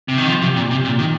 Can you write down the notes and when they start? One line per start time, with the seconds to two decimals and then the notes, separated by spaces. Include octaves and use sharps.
0.08 C3
0.18 D#3
0.27 F3
0.41 C3
0.56 A#2
0.71 C3
0.85 A#2
0.99 D#3